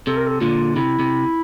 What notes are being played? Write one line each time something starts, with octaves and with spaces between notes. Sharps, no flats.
C3 A4
A#4
A4
A#2 D3 F4
C3 E4
C3